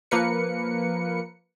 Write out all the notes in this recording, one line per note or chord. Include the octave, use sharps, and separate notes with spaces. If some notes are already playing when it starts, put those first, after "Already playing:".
F3 A#3 A#4 B4 C#7